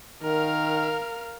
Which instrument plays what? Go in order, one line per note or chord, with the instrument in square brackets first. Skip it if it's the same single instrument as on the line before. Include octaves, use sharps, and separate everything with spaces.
[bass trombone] D#3 [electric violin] A#4 F5